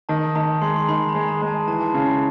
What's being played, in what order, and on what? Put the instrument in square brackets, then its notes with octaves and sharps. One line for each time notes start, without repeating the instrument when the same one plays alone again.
[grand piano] D#3 [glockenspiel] A5
[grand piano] D#3 [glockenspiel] A#5
[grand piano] G#3 [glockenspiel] C6
[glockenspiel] C6
[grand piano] D#3 [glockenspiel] B5
[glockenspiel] B5
A#5
[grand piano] G#3
[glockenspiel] A5
[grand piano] G#3
[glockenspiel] G#5
[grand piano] E3 [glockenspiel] A5
[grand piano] C#3